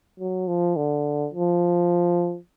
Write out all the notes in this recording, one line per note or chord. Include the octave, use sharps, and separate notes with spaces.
F#3
F3
D3
F3